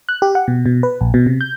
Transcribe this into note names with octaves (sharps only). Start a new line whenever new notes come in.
F#6
G4
F#5
B2
B2
B4
A#1
B2
C3
G6